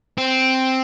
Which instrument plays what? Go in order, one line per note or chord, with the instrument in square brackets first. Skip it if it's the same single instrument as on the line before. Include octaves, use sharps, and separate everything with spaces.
[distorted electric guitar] C4